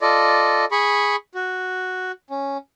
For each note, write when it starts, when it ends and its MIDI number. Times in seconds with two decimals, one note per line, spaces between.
0.01 0.65 65
0.01 0.65 69
0.01 0.65 74
0.01 0.65 75
0.72 1.16 68
0.72 1.16 83
0.72 1.16 85
1.35 2.12 66
2.30 2.58 61